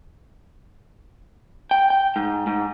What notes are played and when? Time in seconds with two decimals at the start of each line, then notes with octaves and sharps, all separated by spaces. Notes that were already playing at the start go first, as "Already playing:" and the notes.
1.71 G5
1.90 G5
2.16 G#2
2.47 G#2